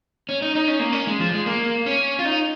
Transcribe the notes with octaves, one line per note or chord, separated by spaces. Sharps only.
C#4
D#4
D#4
C#4
A#3
C#4
G#3
F3
G#3
A#3
C#4
F4
D#4